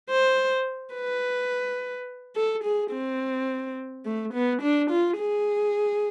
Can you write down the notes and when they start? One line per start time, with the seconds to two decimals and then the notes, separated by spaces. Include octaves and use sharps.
0.10 C5
0.94 B4
2.36 A4
2.64 G#4
2.92 C4
4.05 A3
4.34 B3
4.62 D4
4.91 F4
5.18 G#4